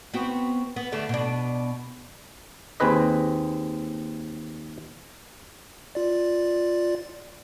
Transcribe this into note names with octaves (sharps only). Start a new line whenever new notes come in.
B3 C4 F#4
B3
D3 A3
B2 D4
D#2 C4 G#4 B4 D#5
F4 D5